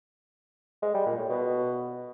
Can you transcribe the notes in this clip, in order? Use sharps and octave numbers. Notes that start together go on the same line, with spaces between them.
G#3
G3
A#2
A2
B2